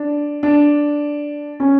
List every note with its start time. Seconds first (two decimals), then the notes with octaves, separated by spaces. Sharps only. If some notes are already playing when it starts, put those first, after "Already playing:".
Already playing: D4
0.43 D4
1.60 C#4